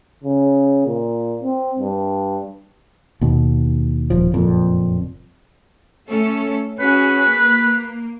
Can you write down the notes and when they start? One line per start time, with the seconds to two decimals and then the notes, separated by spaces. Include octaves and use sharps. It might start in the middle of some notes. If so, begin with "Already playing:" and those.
0.24 C#3
0.87 A#2
1.43 C4
1.79 G2
3.21 D#2 B2
4.10 D#1 F3
4.32 F#1 F2 A#2
6.07 A3 C#4 A4
6.80 C#4 F#4 G#4 B4
7.32 A#3